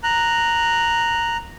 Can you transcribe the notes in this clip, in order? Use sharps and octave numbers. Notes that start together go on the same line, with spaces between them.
A#5 F#6